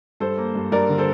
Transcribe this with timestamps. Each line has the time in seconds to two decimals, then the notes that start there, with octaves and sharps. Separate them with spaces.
0.20 G2 A4 C5
0.38 A#3
0.55 G2
0.72 G2 A#4 D5
0.89 D3
0.98 A4 C5